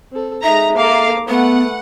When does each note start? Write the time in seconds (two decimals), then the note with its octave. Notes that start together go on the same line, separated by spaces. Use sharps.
0.12 C4 A4
0.43 G#3 D#4 E5 A#5
0.77 A#3 A4 F5 D6
1.29 A3 B3 B4 F#5